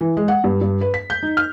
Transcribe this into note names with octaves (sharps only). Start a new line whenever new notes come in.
E3
G#3
F#5
G2
G2
B4
B6
G6
D#4
F6